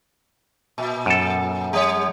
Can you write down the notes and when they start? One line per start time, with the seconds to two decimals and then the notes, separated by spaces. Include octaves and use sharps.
0.78 A#2
1.06 F#2 A4
1.73 G3 C#5